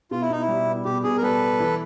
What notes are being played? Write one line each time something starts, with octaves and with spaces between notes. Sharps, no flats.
B2 F4
E4
B2 D#4
E4
G3
B3
B2 G4
B2 G#4
A#4
G3 A4 B4
B3
E3